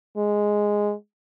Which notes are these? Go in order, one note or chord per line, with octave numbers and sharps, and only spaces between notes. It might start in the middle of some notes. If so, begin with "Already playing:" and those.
G#3